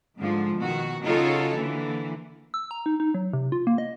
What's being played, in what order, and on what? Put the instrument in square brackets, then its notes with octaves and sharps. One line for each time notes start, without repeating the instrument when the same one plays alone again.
[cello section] G#2 D3 F3 G#3
B2 D#3 F#4
C#3 D#4 F4 F#4 A4 C#5
D3 E3 A#3
[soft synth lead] E6
A#5
D#4
D#4
F#3
C3
F4
A#3
D#5